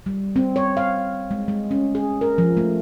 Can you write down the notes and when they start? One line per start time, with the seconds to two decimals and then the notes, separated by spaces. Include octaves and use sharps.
0.06 G3
0.36 C4
0.56 C#5
0.77 F5
1.31 G#3
1.48 G#3
1.71 C#4
1.95 G#4
2.21 A#4
2.38 F3
2.57 A3